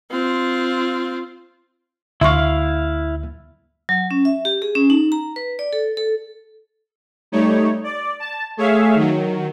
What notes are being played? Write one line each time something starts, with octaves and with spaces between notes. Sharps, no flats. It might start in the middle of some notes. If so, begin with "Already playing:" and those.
C4 F4
D2 E4 E5 F5 C6 C#6
F#3
C#4
E5
G4
G#4
C#4
D#4
A#5
B4
D5
A4
A4
G3 A3 D#4 C#5
D5
A5
A3 G#4 C#5 E5 F5
D#3 F#3